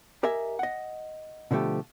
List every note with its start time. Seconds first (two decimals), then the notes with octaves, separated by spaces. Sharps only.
0.23 G4 A#4 D#5 E5 G#5
0.59 D#5 F#5
1.51 B2 D3 F3 A3 G4